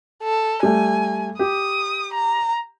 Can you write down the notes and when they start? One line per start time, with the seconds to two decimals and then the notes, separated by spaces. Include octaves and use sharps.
0.23 A4
0.63 G3 A3 G#5
1.39 G4 D#6
2.14 A#5